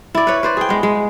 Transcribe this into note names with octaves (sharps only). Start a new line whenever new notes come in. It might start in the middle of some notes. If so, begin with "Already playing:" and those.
E4 D5
B4 C#5
B4 C5 D5
G#4 G5
G#3 B3
G#3